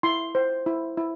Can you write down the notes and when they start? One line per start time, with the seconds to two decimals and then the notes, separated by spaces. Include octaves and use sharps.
0.03 E4 C6
0.35 C5
0.66 E4
0.97 E4